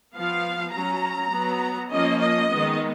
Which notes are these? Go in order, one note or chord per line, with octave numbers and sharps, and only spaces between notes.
F3 B3 F5
F#3 C#4 A#5
F#3 B3
F3 A#3 C#4 D#5
D#5
D#3 G#3 B3